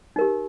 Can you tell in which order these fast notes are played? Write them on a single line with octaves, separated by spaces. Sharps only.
D#4 A#4 G4